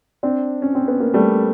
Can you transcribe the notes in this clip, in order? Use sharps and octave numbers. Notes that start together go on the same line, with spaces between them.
C4 D4
C#4
C4
B3
A#3
G3 A3